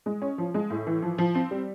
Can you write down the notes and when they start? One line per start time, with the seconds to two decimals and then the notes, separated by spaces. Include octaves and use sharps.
0.06 G#3
0.22 C#4
0.38 F3
0.54 G#3
0.70 A2
0.87 E3
1.02 F3
1.18 F3
1.35 C4
1.51 G3